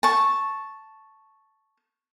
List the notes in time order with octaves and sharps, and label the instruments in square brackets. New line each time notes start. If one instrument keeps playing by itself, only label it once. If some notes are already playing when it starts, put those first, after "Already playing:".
[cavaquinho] A5 C#6